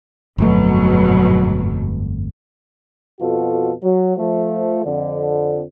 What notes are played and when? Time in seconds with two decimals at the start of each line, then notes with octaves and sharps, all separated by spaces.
0.38 G1 F2 G#2 B2 F#3 A3
3.20 F2 B2 F4 F#4 A4
3.83 F#3
4.17 F3 A3
4.86 F2 D3